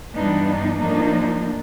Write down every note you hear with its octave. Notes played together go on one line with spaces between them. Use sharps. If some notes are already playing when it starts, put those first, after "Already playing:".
G2 E3 G3 B3 D4 D#4
D#4
A2 F3 A#3 D4 D#4